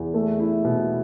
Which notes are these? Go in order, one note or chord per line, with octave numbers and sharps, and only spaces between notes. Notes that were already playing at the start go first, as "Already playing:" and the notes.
Already playing: E2
A3
E4
B2